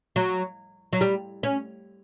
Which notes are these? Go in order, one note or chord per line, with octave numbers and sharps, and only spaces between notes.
F#3
F#3
G3
C#4